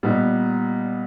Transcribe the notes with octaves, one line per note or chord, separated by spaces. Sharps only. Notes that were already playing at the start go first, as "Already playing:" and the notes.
A#2 G3 B3 D#4